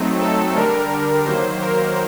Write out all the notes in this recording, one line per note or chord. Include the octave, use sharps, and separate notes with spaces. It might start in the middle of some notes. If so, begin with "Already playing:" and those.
Already playing: F#3 A3 C4 D#4
A4
D3 G3 D4 A#4
D#3 F#3 A#3 C5
A#4